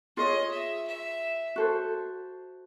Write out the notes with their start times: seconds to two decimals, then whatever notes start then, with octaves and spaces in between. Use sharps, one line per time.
0.17 F4 G#4 C#5 D#5
0.52 E5
0.87 E5
1.56 F#4 A4 C5